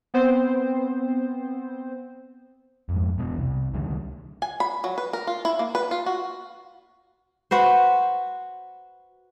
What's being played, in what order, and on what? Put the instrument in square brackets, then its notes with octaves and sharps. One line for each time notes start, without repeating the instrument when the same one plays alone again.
[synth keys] B3 C4 C5
[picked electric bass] F2 G#2
E2 B2 D3 E3
C2 C3
C#2 D3 D#3 G3
[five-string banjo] G#5
B5
F#3
B4
A#4
F4
E4
A#3
B4
F4
F#4
[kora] F#4 B4 C5